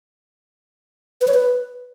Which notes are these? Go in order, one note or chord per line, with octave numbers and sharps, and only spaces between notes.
B4
C#5
B4